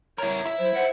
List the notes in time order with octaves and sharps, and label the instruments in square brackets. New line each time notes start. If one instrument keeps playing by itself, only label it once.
[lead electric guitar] E4 A#4 [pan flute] C#5
[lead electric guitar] E4 E5
[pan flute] F#3 [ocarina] C5
[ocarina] C5 [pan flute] F#5